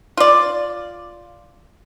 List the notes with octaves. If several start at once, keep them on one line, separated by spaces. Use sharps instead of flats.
F4 D5